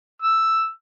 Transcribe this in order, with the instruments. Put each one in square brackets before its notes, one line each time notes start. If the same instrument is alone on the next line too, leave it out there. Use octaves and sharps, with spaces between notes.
[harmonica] E6